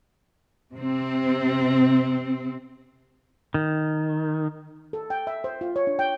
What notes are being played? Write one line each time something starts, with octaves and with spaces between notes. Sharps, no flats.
C3 C4
D#3
A4
G5
E5
C5
F4
C#5
D4
G5